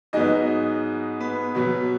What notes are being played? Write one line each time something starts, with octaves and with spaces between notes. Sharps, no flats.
G#2 F#3 B3 D#4 D#5
B3 B4
B2 F#3 B3